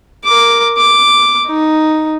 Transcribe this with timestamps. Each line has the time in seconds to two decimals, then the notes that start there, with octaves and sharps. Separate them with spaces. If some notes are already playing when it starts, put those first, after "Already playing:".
0.24 A#4 D6
0.77 D6
1.47 D#4